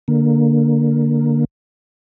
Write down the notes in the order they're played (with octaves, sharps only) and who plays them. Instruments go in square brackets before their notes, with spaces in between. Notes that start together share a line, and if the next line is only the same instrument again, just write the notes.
[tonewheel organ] D3 A#3